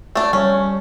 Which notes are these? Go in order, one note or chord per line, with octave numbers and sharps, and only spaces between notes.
A3 D4
G3 C#4 C#5